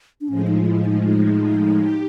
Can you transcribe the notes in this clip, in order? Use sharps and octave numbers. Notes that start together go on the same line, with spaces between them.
D4
A2 F3 G#3 C#4
D#4
E4
D#4
D#4
G4